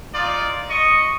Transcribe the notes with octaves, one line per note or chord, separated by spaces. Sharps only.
D#4 F4 D5
D#5 C#6